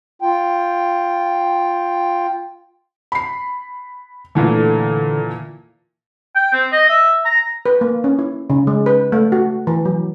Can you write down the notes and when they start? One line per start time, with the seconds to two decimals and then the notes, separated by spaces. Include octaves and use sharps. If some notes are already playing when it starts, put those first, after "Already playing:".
0.22 F4 G5
3.12 B5 C7
4.35 A#2 D3 E3 A3
6.36 G5
6.53 C4
6.72 D#5
6.89 E5
7.25 A#5
7.66 B4
7.81 A#3
8.04 C#4
8.19 E4
8.50 C#3
8.67 G#3
8.86 B4
9.12 A3
9.32 F#4
9.67 E3
9.85 F#3